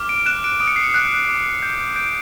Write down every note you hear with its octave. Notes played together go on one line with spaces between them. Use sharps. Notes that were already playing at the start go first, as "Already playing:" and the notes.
Already playing: D6 F6
D7
F#6 E7
D7
D#6 D7
C#7
C7
C#7
F#6
D6
G6
G6 D7